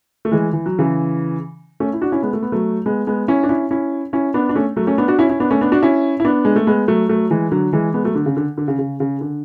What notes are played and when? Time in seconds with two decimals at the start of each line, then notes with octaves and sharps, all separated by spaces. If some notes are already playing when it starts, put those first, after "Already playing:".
0.25 A3
0.32 E3 G#3
0.53 E3
0.66 F#3
0.79 C#3 E3
1.80 A3 C#4
1.93 E4
2.01 D4 F#4
2.12 C#4 E4
2.22 G#3 B3
2.33 A3
2.42 B3
2.52 F#3 A3
2.86 G#3 B3
3.07 G#3 B3
3.28 C#4 E4
3.43 D4
3.49 C#4 E4
3.71 C#4 E4
4.13 C#4 E4
4.34 B3 D4
4.49 D4
4.55 A3 C#4
4.76 F#3 A3
4.87 A3 C#4
4.98 B3 D4
5.08 D4 F#4
5.19 C#4 E4
5.29 C#4 E4
5.40 B3 D4
5.51 A3 C#4
5.61 B3 D4
5.72 D4 F#4
5.83 C#4 E4
6.20 E4
6.25 B3 D4
6.45 G#3
6.56 A3
6.67 G#3 B3
6.88 F#3 A3
7.09 F#3 A3
7.31 E3 G#3
7.52 D3 F#3
7.73 E3 G#3
7.94 G#3 B3
8.04 F#3 A3
8.15 D3
8.26 C#3
8.37 D3
8.58 D3
8.68 C#3
8.79 C#3
9.00 C#3
9.21 D3